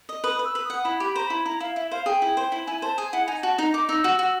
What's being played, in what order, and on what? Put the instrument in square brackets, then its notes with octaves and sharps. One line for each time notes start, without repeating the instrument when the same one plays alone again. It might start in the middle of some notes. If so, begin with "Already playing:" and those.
[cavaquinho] D#5
[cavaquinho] B4 [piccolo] D#6
[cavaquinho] B4
[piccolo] E6
[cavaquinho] B4
[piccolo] D#6
[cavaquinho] F#5
[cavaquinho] E4 [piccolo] B5
[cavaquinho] G4 [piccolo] B5
[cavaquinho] C5 [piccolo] A#5
[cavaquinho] E4 [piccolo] B5
[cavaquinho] E4 [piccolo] A#5
[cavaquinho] E4 [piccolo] F5
[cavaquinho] E4 [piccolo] E5
[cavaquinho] C5 [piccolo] F5
[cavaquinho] G#4 [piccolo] G5
[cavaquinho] E4
C5
E4
[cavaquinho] E4 [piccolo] G#5
[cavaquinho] C5 [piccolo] A5
[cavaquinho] G#4 [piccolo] G#5
[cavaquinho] E4 [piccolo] F#5
[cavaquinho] D#4 [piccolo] G#5
[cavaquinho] F#4 [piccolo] A5
[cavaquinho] D#4 [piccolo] A#5
[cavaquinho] D#4 [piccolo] D6
[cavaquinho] D#4 [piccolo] E6
[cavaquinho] F#4
F#4